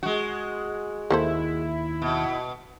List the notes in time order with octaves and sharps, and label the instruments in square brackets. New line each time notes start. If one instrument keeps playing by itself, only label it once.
[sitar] G#3 F#4
[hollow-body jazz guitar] D#2 [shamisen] A#3 A4 C5 [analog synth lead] E4
[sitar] B2